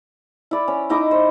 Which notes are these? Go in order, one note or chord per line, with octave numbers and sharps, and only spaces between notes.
E4 D5
C#4
D#4 E4 D#5 D6
C5